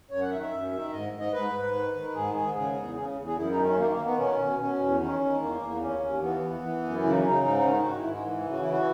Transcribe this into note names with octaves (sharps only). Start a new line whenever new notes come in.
F#2 C#5
F#5
D#3 E5
E5
F#2
D#3
G#2 D#5
G#2
D#5
G#2 B4
G#2
D#3
D#3
G#2 G#4
G#2 G#4
C#3 G#4
E2
C#3 G#4
E2
G#4
F#2 E4
D#4
D#3
C#4
D#3 A#3
A#3
D#3
B3
B2 C#4
B2
B2 C#4
E2
D#3 C#4
D#3
G#3
E2 A#3
E2
D#2 C#4
D#2
E3 B3
E3
E3
F#2
C#3 E4
D#4
C#4
C#3 D#4
G#2 D#4
D#4
D#3 C#4
D#4
G#2 F#4
E4
G#2
G#3
E3
C#3
F#4
E3 E4
F#4